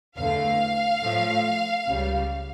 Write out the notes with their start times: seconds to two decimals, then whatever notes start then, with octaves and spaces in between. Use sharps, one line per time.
0.17 E2 D3 A3 F5
1.02 A2 F3 A3
1.87 C#2 C#3 G3